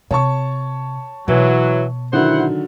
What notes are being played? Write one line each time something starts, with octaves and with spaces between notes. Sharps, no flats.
C3 C#5 A5 C#6
B2 E3 F#3
D3 D#3 F#3 E4 C5 F#5